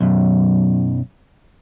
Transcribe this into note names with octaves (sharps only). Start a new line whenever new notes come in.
B1 F#2